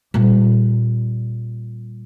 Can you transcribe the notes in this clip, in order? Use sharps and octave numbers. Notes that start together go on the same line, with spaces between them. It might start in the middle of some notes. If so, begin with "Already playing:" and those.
A#2 G3